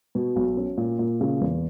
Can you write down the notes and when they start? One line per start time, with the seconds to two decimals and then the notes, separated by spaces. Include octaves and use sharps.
0.15 B2
0.36 B1
0.57 C#4
0.77 A#2
0.99 A#2
1.21 C#3
1.41 E2